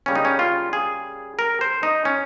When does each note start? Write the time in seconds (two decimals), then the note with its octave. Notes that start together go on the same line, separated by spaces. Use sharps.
0.06 C#3 G3 A#3 C#4
0.15 D#4
0.25 C#4
0.39 F4
0.73 G#4
1.39 A#4
1.61 C5
1.83 D#4
2.05 C#4